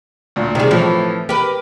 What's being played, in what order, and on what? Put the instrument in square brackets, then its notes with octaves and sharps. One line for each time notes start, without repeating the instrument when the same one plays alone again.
[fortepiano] D2 A#2
[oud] C3 G#4 [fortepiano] D#3 G3
[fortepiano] A2 F3 [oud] E3
[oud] G4 B4 [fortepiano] A#4